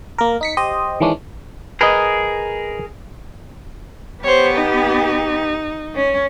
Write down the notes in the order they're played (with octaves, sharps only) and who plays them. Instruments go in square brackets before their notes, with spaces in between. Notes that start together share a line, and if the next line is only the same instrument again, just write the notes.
[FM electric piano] A#3 A#4
D#4 B6 C#7
G4 C5 D#5
D#3 E3 G#3 C#4 D4
[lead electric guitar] G#4 A#4 [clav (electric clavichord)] B4 D#5
[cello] B3 G4 [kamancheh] C5 C#5
[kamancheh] D#4
[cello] C#4